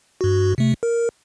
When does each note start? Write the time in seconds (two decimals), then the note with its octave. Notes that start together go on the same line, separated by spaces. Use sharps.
0.21 G2 F#4
0.58 C3 A3
0.83 A#4